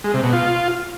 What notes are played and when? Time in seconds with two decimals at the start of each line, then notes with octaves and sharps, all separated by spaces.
0.04 G#3
0.14 C3
0.23 B2
0.33 F4